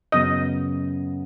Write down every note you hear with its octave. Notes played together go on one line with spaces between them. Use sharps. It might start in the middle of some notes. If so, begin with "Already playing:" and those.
F#2 C#3 F#3 B3 D#5